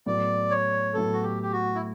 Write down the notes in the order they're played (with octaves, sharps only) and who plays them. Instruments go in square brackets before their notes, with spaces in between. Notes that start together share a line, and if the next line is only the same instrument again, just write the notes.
[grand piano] A2 F#3 B3 [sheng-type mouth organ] D5
[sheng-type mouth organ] C#5
[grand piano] A2 F#3 B3 [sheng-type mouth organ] A4
[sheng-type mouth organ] F#4
G4
G4
F#4
E4